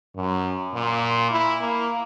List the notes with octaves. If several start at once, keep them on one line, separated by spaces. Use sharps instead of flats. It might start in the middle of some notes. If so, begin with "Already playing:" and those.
F#2
A#2
E4
A#3